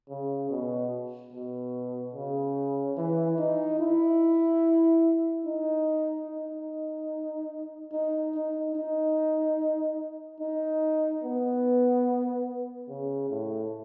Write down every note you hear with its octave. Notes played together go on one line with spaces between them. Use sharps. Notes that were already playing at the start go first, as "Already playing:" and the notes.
C#3
B2
B2
C#3
E3
D#4
E4
D#4
D#4
D#4
D#4
D#4
D#4
B3
C#3
A2